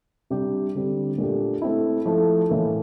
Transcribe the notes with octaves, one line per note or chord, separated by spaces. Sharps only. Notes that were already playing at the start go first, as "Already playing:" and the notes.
C3 G3 D4 G4
D3 G3 C4
A#2 A3 D4 G4
A3 C4 E4
F3 A3 E4 A4
A2 E3 A#3